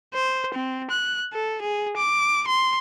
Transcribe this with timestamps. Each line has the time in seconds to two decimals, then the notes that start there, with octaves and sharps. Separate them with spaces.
0.14 C5
0.54 C4
0.91 F#6
1.33 A4
1.62 G#4
1.97 D6
2.47 C6